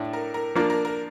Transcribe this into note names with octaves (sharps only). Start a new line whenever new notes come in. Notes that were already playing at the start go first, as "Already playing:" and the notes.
Already playing: A2 A3 D4
A#4
A#4
F3 A#3 D4 A#4
A#4
A#4